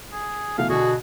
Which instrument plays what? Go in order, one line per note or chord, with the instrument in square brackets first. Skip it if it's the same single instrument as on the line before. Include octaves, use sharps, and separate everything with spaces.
[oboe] G#4
[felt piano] B2 E3 A3 [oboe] F5
[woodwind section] B2 F#4 [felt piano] D3 [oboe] G#4